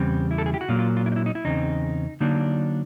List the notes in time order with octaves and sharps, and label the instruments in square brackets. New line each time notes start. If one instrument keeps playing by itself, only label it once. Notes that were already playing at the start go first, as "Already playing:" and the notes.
Already playing: [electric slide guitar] E2 C#3 G3 C4
E4
A4
G#4
G4
F#4
A#2 F#3 A#3 F4
F4
F4
E4
D#4
E4
D#4
E4
E2 C#3 C4 D#4
D3 F#3 A#3 D4 D#4